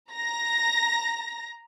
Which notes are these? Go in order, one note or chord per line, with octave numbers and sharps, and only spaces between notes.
A#5 A#6